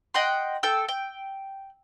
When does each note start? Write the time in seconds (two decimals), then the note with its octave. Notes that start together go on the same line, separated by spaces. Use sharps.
0.14 D#5 F#5 G5 C6
0.63 A4 G5 E6
0.89 G5